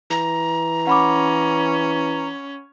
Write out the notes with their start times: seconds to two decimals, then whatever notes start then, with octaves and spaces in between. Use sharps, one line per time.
0.10 E3 A#5
0.87 C#4 F#5 B5 D6